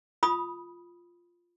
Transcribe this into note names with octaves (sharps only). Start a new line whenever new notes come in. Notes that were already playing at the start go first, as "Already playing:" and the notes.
F4 B5 D#6